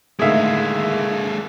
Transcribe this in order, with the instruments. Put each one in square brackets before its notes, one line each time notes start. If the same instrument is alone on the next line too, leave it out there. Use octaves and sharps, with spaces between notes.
[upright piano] A2 D3 D#3 [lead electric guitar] G#3 A#3 [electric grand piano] G#4 E5 F5